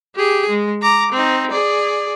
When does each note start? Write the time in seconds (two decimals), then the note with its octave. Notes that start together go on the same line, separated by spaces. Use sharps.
0.15 G4 G#4
0.50 G#3
0.82 A#5 D6
1.12 C4 D#4
1.51 G#4 D5